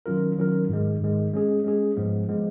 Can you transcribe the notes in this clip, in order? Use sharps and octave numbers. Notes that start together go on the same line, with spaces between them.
D#3 F#3 C#4 F4 A#4
D#3 F#3 C#4 F4 A#4
G#2 D#3 G#3
G#2 D#3 G#3
G#3 C#4 G#4
G#3 C#4 G#4
G#2 F3 G#3 B3
F3 G#3 B3